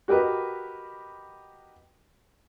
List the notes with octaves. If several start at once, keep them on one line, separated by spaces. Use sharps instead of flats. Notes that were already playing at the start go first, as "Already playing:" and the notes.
F#4 G4 A#4 B4 D#5